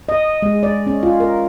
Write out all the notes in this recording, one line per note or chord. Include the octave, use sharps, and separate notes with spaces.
D#5
G#3
D5
C#4
F4
A#4